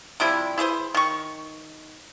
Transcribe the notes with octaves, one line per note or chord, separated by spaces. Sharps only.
C3 F3 G3 E4
E4 G#4 B4 C5
D#3 C#6